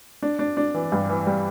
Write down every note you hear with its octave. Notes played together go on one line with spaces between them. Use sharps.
D4
D4
D4
E3
G2
E3
G3